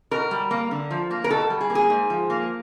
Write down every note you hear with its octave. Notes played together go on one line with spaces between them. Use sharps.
B2 A#4
G3
A#3
D3
F3
A#3
A#4
B2 A4
G3
G#4
A#3
G#4
G#2
F3
A#3